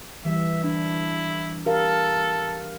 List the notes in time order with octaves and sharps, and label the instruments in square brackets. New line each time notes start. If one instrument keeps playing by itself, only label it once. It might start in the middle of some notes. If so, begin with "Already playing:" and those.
[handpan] E3 G3 [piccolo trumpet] E5
[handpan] D4 [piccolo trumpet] E4
[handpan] G4 A#4 F5 [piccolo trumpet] A4